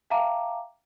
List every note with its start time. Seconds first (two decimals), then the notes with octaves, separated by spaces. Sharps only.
0.10 E5 F5 G5 A5 A#5 D6